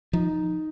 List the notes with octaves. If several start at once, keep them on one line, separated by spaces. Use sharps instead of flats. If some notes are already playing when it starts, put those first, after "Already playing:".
F3 D#4